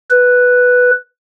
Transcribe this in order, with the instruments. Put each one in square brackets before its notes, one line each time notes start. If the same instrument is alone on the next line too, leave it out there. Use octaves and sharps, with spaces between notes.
[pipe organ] B4